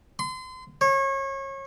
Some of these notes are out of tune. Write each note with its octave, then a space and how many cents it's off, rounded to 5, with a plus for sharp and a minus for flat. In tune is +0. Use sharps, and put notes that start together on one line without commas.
C6 -35
C#5 -30